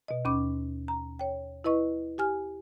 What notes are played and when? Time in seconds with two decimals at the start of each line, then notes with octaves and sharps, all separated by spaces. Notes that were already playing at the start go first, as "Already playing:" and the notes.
0.08 B2 D#5
0.25 D#2 C#4 B5 D6
0.88 A#5
1.19 C#5 G5
1.64 E4 B4 D#5 C#6
2.18 G4 G#5 F6